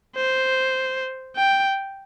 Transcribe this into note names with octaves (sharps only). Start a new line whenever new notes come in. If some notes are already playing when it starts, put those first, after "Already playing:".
C5
G5